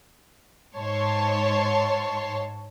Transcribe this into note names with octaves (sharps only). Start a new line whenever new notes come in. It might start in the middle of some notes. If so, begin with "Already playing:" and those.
G#2 C#5 A5 C6